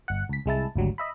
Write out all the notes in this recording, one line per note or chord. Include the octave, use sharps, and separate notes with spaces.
G1 F#5
C#2 B6
C2 G#3 E4 A5
G#1 D2 F#3 G3
D#5 E5 B5